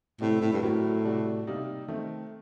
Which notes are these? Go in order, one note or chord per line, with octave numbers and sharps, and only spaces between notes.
A2 C3 G3 C4
A2
G2
A2 D3 F#3 C4 F#4 A#4
C3 G3 D4 F#4
C3 G3 A#3 D#4
D#3 A3 C4